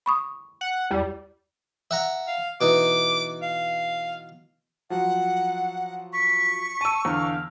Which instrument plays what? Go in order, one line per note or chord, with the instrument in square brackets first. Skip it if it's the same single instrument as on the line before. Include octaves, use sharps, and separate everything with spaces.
[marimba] B5 C#6 D#6
[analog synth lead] F#5
[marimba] E2 [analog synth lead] G3
[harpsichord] E5 F#5 A#5
[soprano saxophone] F5
[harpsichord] B2 E3 D#4 [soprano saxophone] D6
[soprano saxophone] F5
[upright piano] F3 F#3 [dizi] F#5
[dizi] C#6 [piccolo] B6
[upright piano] A5 E6 [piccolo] D#7
[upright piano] E2 D3 [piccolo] F5